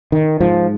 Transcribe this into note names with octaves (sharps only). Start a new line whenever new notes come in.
D#3
G#2 F3